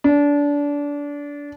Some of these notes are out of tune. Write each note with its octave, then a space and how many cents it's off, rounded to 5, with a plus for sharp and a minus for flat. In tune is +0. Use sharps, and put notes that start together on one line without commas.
D4 -25